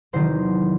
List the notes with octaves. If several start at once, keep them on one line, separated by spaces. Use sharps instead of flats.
E2 C3 D#3 F#3 C5